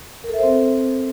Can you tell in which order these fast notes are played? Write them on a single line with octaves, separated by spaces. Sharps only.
A#4 A4 E5 C5 C4